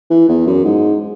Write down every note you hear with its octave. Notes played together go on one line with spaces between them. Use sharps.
E3
E2
F#2
G#2